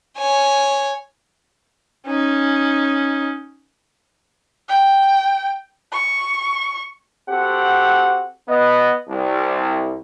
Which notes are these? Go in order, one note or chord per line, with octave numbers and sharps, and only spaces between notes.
C#5 G#5
C#4 D#4
G5
C#6
C4 F#4 G4 A4 F#5
B3 D#5
C2